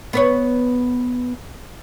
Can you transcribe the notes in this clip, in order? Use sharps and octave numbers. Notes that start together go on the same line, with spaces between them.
B3 B4 C#5